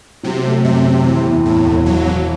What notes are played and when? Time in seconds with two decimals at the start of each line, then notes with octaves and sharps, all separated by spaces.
0.23 C3 F#3
0.44 A3
0.64 F#2 C3
0.85 C4
1.04 E3
1.25 E2
1.46 E2 A2
1.66 E1
1.86 E3 F#3
2.06 E3